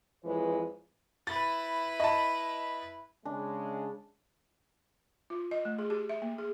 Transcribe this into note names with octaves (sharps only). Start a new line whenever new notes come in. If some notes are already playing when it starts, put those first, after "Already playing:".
F2 E3 G#3 B4 C#5
E4 B4 A6
D#5 A5
C#3 G#3 D4
F4
D#5
A3
G#4
G4
E5
A#3
G#4